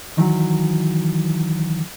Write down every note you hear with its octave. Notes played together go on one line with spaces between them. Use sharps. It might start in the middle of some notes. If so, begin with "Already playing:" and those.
D#3 E3 F#3